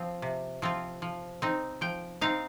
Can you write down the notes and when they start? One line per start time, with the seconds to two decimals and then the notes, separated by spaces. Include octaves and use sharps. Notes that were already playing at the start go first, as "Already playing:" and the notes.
Already playing: F3 C4 F4
0.22 C3
0.62 F3 C4 F4
1.02 F3
1.42 C4 D#4
1.81 F3 G5
2.21 C4 D#4 F5